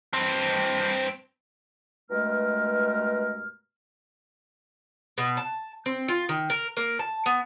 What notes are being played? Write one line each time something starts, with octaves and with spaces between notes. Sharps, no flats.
G2 C4
G2 B2 G#3 A3 A#4 F6
B2
A5
C4
F4
D#3
A#4
A#3
A5
B3